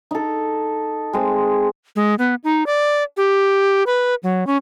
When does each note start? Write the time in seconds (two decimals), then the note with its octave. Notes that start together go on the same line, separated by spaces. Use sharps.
0.11 D#4 A4
1.13 G#3 C4
1.96 G#3
2.19 B3
2.44 D#4
2.66 D5
3.17 G4
3.87 B4
4.23 F#3
4.47 C#4